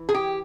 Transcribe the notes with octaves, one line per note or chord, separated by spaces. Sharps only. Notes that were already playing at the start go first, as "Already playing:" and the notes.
Already playing: E3
G#4
G4